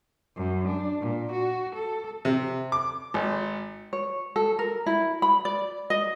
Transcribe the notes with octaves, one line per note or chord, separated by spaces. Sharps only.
F#2
D4
A#2
F#4
A4
C3
D6
G#1
C#5
A4
A#4
E4
B5
D5
D#5